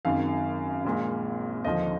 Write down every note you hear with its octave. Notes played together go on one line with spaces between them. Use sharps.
G#1 F#2 D#3 F5
A#1 A#2 G#3
D#2 D3 F3 D#5